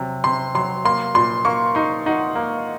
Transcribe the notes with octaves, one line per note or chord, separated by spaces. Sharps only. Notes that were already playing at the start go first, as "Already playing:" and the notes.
Already playing: C3 F#3
C3 C6
F#3 C6
A#3 C6
A#2 C6
A#3 C#6
D#4 C6
D#4 F#5
A#3